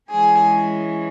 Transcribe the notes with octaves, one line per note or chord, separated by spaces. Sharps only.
E3 G#3 C#4 G#4